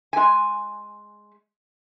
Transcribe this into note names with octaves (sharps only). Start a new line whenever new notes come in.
G#3 G#5